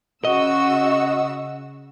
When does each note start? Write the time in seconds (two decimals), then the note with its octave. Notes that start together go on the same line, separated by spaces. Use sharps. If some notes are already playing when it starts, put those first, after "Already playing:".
0.25 C#3 F#4 D#5 E6